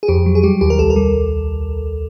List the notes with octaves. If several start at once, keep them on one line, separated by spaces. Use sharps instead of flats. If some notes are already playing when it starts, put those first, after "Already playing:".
G#4
F2 G4
F#3
G#4
G3 G4
D#2 G4
A#4
C2 A4
A#4
G3